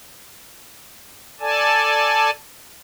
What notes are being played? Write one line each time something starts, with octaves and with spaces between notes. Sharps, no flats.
A4 D5 G#5 A5